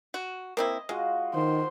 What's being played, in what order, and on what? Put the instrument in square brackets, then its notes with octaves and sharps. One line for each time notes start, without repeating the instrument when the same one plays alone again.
[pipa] F#4
[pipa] A#3 C4 E4 [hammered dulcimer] D#5
[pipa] G#3 [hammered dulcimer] F4 F#4
[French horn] D#3 [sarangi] C5